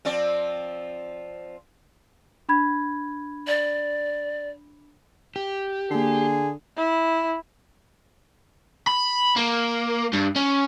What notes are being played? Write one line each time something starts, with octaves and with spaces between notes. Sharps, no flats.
F3 C4 D5
D4 B5 G#6
D5
G4
D3 A#3 G#4 C7
E4
B5
A#3
G2
C#4